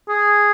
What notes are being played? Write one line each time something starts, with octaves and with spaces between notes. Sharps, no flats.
G#4